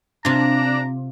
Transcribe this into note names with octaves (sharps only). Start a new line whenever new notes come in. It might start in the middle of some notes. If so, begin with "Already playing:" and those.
C3 D4 F4 A#5